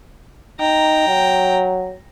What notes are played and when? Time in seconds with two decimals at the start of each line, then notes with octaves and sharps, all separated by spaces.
0.60 D#4 G5 A#5
1.08 F#3